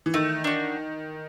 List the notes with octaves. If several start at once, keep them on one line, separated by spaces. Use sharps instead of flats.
E3
D#3 A3
D4 F#4